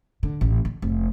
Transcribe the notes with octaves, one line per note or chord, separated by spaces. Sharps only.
D3
A1
D3
F1